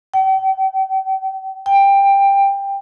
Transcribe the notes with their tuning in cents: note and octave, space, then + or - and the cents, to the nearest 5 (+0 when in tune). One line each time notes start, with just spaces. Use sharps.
G5 -40
G5 +15